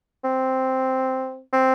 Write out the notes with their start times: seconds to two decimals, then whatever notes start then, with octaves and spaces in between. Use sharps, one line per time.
0.24 C4
1.53 C4